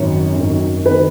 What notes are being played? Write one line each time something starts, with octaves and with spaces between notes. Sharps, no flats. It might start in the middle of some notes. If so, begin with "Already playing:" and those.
Already playing: G#1 F#2 D#3 C#5
G#1 F#2 D#3
D#3 B4